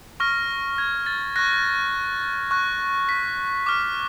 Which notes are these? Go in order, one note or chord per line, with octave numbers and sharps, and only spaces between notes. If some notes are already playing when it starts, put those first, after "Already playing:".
C#6 F6 A#6
G#6
A6
C#6 F#6 A#6
C#6 F#6
B6
D6 F6